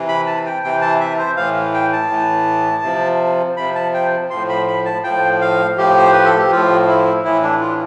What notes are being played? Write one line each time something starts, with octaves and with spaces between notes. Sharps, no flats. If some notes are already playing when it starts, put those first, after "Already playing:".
Already playing: C3 E3
B5
A5
G5
C3 E3 G5
A5
E5
C5
A2 E3 F5
G5
A5
A2 E3
C3 F3
C3 F3 B5
A5
G5
A2 F3 C6
B5
B5
A5
A2 F3 G5
F5
A2 F3 G4
C5
B4
A4
G4
A2 F3 F4
E4
A2 E3 E4
D4
F4